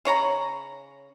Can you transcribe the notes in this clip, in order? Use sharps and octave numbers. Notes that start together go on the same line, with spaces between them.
C#3 C#5 A#5 B5